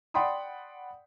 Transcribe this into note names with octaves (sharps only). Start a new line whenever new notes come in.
D5 F#5 G5 B5 C6 D#6